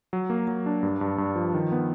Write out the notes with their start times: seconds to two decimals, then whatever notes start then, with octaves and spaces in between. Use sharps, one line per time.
0.13 F#3
0.30 A#3
0.48 F#3
0.66 D4
0.83 G2
1.01 G2
1.18 G2
1.36 F3
1.54 D#3
1.72 B3